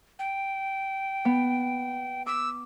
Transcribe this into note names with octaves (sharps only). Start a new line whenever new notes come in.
G5
B3
D6 E6